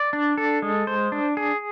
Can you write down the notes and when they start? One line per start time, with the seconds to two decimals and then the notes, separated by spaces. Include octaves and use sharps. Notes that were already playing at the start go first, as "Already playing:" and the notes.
Already playing: D5
0.13 D4
0.38 A4
0.62 G#3
0.87 C5
1.12 D4
1.37 G#4